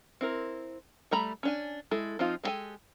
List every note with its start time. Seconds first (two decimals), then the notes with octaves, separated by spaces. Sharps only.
0.21 C4 E4 A#4
1.11 G3 A3 A#5 B5
1.43 C#4 D4 G#5
1.91 G#3 E4 A4
2.19 F3 C4 D#4 F4
2.43 G#3 C#4 G4 A4 G#5